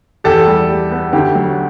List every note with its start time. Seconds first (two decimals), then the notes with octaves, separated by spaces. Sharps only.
0.24 E2 G4 A4
0.47 G3
0.69 G3
0.91 B3
1.13 D2 G4
1.35 F#3